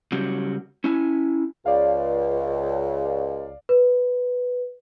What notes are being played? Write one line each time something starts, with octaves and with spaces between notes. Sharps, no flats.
C#3 F#3 G3 C#4 F#4 G4
C#4 E4 G#5
C#2 D5 F5
B4